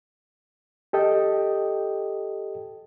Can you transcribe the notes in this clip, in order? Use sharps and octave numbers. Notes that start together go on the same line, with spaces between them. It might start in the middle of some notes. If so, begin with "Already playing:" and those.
G4 A4 D#5 G5